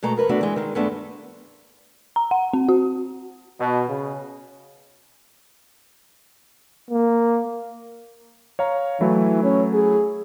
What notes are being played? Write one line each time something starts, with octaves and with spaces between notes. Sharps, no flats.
B2 G#3 A3 A#5
F2 A#4 B4 A#5
A2 A3 B3 D4 F#4
E3 G#3
D#3 G#3
G2 G#3 A3 B3 D4
A#5
F#5
C4
F#4
B2
C#3
A#3
C#5 F5 A#5
E3 F#3 A3 E4
C#4
G#4